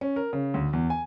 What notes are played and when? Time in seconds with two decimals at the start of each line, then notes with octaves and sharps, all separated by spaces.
0.01 C#4
0.16 A#4
0.33 C#3
0.54 D2
0.73 E2
0.90 G#5